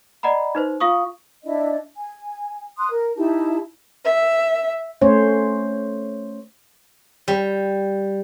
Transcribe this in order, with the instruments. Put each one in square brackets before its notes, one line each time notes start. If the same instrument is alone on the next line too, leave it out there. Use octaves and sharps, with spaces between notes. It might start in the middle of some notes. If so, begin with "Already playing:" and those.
[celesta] D5 D#5 F#5 A#5 B5
D#4 B4 C5
F4 F5 C#6 D#6
[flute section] D4 E4 D5 D#5
G#5
C6 D#6 F#6
A#4
D#4 E4 G4 A5
[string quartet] E5
[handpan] A3 C#4 C5 C#5
[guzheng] G3